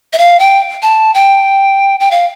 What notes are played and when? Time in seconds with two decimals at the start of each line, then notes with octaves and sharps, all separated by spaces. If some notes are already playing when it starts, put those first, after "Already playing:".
0.13 E5
0.18 F5
0.40 G5
0.82 A5
1.15 G5
2.00 G5
2.11 F5